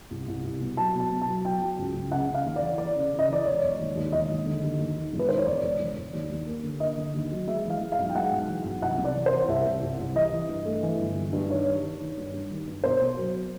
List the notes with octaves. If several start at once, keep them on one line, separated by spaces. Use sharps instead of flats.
C2
C2
C2
B2
F#3 A5
B2
A5
B2
A5
F#3
F#3 G5
F#3
C#2
C#2
C#3 F#5
C#3
F5
D#2
D5
E3
E3 D5
C#3
C#3
D#5
E3 D5
E1 C#5
E1
D#2
D#2
E1 D#5
D#2
D3
D#2
D#2
D#3
E1
B4
D#3 C5
C#5
E1 D5
E1
E1
E1
D#2
D#2
A#3
D3
A#3 D#5
D3
D#2
F#3
G#3 E5
E3 F5
G#3
F5
B1
G5
G#3 F#5
B1
E3
B1
C2 F#5
C3
D5
E3
C5
E3
C2 E5
C2
C2
C2
E3 D#5
E3
G2
A3
E3
G1
G2
G2
D#3 C#5
D#3
D#3
D#3
G2
G3
D#3
G2
B2 C5
B2
F#3